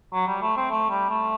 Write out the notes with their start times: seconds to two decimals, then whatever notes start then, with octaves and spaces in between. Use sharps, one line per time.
0.13 F#3
0.27 G3
0.41 A3
0.56 C4
0.71 A3
0.90 G3
1.09 A3